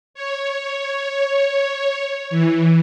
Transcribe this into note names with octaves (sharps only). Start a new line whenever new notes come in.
C#5
E3